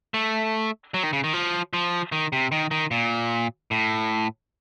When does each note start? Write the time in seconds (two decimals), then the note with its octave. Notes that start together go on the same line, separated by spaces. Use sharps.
0.14 A3
0.94 F#3
1.03 D#3
1.13 C#3
1.24 D#3
1.33 F3
1.73 F3
2.12 D#3
2.33 C3
2.52 D#3
2.71 D#3
2.91 A#2
3.71 A2